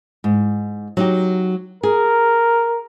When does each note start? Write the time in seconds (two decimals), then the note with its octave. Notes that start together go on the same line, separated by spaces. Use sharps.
0.24 G#2
0.97 F#3 D#4 G4
1.83 G#4 A#4